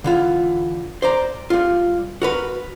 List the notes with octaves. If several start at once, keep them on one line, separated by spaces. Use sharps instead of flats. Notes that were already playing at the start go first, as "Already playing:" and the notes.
D3 E3 F4
C5 D5 A#5
G3 F4
F#4 A#4 B4